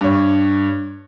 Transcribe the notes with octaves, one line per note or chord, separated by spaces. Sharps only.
G2 C#5